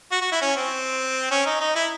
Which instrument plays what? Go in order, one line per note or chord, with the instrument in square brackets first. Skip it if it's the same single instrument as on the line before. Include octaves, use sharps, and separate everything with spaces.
[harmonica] F#4
F#4
E4
C#4
C4
C#4
D#4
D#4
E4